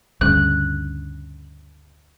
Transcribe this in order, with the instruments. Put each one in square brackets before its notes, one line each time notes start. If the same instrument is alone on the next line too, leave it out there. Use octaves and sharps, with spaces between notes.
[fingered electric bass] D2 G2 C#3 [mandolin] F#6